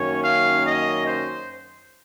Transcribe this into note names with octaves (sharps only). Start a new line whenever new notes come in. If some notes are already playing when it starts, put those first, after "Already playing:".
Already playing: F#2 D#3 A#3 C#4 C#5
F5
D#5
C5